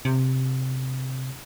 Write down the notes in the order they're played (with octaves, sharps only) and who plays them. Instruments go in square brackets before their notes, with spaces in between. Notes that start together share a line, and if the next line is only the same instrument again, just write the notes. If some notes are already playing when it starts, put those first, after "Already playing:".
[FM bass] C3